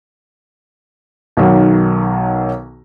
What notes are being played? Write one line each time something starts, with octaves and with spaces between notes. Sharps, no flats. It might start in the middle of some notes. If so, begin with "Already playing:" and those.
B1 D#3 F#3